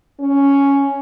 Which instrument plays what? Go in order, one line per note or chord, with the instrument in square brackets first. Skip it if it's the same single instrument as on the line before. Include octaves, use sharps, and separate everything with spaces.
[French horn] C#4